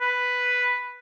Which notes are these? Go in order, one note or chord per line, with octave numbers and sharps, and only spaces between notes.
B4